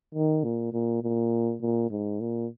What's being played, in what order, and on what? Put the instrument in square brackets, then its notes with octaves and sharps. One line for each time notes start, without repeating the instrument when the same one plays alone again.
[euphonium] D#3
A#2
A#2
A#2
A#2
G#2
A#2